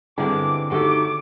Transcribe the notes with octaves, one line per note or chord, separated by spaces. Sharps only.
G2 D3 G3 G#3 B3 C4 E4 D6
D#3 A3 F#4 G4 A4 D6